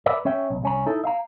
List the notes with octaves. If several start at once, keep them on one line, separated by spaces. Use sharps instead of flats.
A#4 B4 D5 E5
C#4 C#5 E5 G5
B1
C2 C#4 A#5
D#4 E4 A4
E5 F5 A#5